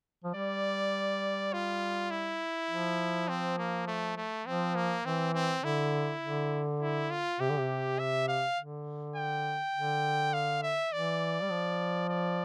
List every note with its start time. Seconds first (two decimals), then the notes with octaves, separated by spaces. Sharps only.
0.24 F3
0.35 G3 D5
1.53 F4
2.11 E4
2.70 F3
3.29 C4
3.58 A#3
3.88 A3
4.17 A3
4.46 F3 C4
4.76 A#3
5.05 E3 C4
5.34 C4
5.63 D3 E4
6.23 D3
6.81 E4
7.11 F4
7.40 C3 G4
7.50 D3
7.59 C3
7.99 E5
8.28 F5
8.58 D3
9.16 G5
9.74 D3
10.34 F5
10.63 E5
10.92 E3 D5
11.43 G3
11.51 F3
12.09 D5